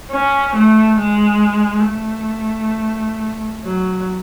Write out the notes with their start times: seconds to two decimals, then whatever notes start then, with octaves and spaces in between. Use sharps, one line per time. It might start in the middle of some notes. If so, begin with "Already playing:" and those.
0.11 C#4
0.56 A3
1.00 G#3
1.88 A3
3.64 F#3